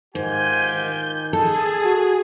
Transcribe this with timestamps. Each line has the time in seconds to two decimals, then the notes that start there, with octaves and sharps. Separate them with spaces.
0.15 G#2 D#3 F4 G4 G#5 G6
0.74 D#3
1.33 G#4 A4 A5
1.84 F#4